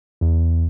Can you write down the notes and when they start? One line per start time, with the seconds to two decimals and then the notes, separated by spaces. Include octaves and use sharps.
0.21 E2